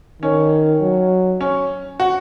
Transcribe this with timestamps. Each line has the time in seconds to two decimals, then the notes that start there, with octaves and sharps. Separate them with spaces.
0.22 D#3 C#4
0.82 F#3
1.41 C#4
2.00 F#4